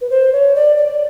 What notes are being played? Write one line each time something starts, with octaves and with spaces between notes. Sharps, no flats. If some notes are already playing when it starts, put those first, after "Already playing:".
B4
C5
C#5
D5
D5